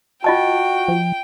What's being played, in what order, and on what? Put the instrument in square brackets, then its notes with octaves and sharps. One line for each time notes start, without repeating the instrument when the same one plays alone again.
[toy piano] F4 D#5 A5 [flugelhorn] F#4 [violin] G5
[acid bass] F3